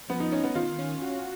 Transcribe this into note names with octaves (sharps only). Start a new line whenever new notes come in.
F3 B3
D#4
C#4 D#4
B3
D#3 F4
C#4
F#4